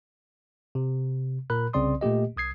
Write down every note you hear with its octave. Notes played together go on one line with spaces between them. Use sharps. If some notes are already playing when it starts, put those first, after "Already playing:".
C3
A#2 A#4 B5 F#6
C2 C#3 C4 D5 C6 D#6
A#2 A3 A#3 G4 D#5
C2 D#6 G#6 C7